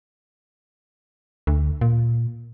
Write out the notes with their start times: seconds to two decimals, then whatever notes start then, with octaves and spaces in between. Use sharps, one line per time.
1.47 D2
1.81 A#2